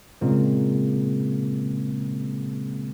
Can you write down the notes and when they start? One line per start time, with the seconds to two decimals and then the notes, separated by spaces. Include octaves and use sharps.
0.21 A#2 C#3 G#3 A#3 C4